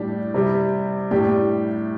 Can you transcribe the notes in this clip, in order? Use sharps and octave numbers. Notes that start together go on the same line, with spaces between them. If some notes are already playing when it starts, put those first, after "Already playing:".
Already playing: A2 G3 D4 G4
C3 G3
A2 G3 D4 G4